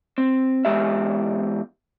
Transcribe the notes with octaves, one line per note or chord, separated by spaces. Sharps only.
C4
E2 G#3 G4 E5